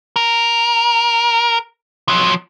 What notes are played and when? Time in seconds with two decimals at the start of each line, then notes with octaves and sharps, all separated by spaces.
0.16 A#4
2.08 F3 F#3